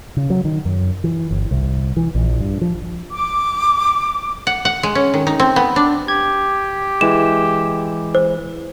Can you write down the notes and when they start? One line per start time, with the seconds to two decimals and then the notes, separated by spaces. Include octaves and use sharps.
0.17 C#3
0.30 F#3
0.45 D#3
0.65 F#2
1.04 E3
1.31 G1
1.51 C2
1.97 E3
2.15 A#1
2.40 G2
2.61 F3
3.11 D6
4.47 F#5
4.65 F#5
4.83 G#3
4.95 C#4
5.14 D#3
5.27 D#4
5.40 C4
5.56 B3
5.76 D4
6.08 G4 G#6
7.01 E3 G#3 E7
8.15 C5